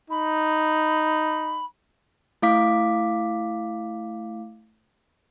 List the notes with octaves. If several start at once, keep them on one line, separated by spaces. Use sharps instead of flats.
D#4 B5
A3 E4 F5 D6 B6